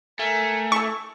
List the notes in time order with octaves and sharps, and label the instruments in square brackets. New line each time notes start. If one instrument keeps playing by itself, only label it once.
[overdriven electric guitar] A3 [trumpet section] A#4 G#5
[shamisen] E4 A4 [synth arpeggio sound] C#6